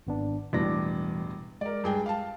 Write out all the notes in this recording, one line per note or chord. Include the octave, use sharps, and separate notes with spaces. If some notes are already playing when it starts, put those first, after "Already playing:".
G#1 B3 D4
E1 A2 E3 G3 D4 A#6
G#3 A#4 D5
G2 G#4 G5
F5 A5